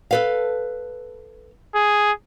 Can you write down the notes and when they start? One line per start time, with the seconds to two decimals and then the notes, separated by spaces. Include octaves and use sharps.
0.11 A4 B4 F5
1.75 G#4